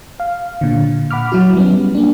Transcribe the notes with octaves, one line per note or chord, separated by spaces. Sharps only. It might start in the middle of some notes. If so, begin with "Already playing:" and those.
F5
A#2 D3
F#5 B5 D6 F6
F#3 E4 F#4
G3 B3 C#4
A#3 D4